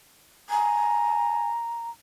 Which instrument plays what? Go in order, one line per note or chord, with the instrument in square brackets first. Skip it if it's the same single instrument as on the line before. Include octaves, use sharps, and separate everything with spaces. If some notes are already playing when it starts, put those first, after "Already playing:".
[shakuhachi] G#5 [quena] A#5